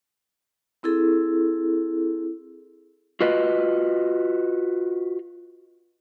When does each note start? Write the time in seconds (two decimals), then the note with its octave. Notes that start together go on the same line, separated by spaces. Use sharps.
0.83 C4 E4 G#4 A4
3.21 F4 F#4 B4 D#5